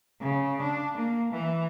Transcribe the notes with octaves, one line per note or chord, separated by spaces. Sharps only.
C#3
D4
A#3
E3